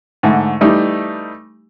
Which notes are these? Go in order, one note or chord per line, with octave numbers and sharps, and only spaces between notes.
G#2 D3 A3
E3 G3 A3 D#4 G4